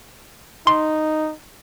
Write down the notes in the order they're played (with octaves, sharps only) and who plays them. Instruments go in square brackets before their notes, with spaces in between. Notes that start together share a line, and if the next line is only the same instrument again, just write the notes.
[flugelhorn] D#4 [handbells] C6